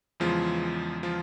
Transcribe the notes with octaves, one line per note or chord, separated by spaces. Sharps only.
E2 C#3 E3 F3 G#3 F4
F3 F4